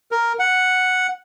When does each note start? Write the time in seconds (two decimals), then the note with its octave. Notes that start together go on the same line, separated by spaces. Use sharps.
0.12 A#4
0.39 F#5